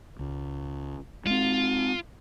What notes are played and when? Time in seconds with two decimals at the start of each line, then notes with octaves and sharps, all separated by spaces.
0.19 C#2
1.26 G#3 C4 F4